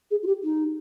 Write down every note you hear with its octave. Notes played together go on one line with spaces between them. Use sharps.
G#4
F4
G4
D#4